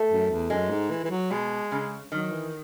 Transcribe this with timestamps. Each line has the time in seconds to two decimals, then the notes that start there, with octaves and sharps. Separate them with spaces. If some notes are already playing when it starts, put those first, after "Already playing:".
Already playing: A3
0.10 F#2
0.31 E2
0.50 F#2 G#3
0.70 G#2
0.91 E3
1.04 E3
1.11 F#3
1.31 B2 G#3
1.72 C#3
2.12 D#3 F#3
2.31 E3